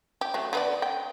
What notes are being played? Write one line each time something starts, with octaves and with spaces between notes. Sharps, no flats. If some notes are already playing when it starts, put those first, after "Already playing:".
G4
F#3 A3
D3 B3 D5
G5